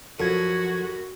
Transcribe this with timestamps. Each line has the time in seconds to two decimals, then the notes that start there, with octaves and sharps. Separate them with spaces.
0.20 F#2 F3 F#4 A4 G#6